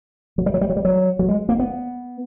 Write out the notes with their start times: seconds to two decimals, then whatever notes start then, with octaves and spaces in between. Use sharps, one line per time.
0.38 F#3
0.46 G3
0.54 F#3
0.61 G3
0.70 F#3
0.76 G3
0.85 F#3
1.19 F#3
1.28 G#3
1.49 A#3
1.59 B3